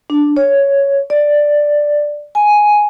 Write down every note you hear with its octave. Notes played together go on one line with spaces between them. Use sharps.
D4
C#5
D5
G#5